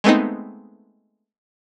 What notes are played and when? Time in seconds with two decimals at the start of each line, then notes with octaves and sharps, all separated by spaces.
0.04 G#3 A3 B3 C4 D#4